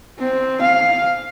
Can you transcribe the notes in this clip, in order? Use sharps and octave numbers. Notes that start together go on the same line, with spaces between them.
C4
F5